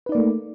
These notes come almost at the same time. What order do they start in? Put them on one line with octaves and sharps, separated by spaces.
B4 D#4 D5 A#3 A3